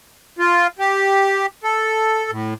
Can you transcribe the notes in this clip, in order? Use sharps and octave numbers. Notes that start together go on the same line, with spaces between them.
F4
G4
A4
A2